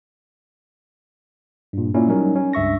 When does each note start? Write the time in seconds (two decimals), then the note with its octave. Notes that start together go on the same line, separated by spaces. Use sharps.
1.73 G2 A#2
1.94 A#2 C#4 E4
2.08 F#3 G3 C#4 D#4 A#4
2.36 C#4
2.53 C#2 G2 E5 C#6 A#6